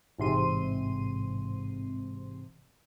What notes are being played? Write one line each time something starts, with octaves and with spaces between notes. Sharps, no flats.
A1 G#2 C3 C6 D#7